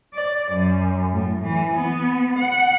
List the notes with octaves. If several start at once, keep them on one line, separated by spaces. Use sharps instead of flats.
D5
F#2
A2
E3
B3
F#5